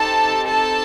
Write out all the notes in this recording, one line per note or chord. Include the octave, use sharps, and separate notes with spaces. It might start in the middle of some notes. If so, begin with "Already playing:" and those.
Already playing: C4 D#4 G4 A4 A5
A4 A5